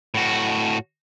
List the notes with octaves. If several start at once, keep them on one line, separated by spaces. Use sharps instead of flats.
A2 F#4